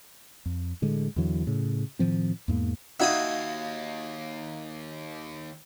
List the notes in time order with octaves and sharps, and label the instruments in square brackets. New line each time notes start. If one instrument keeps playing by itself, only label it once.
[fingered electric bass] F2
A2 D3 G#3
E2 D3 E3 F#3
A2 C#3
A2 D#3 F3 C4
E2 G#2 A#3
[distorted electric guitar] D#2 [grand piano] D#4 F#4 [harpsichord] E5 B5 D#6 [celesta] F5 G#6